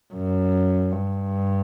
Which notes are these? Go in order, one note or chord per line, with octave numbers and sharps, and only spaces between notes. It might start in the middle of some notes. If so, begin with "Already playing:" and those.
F#2
G2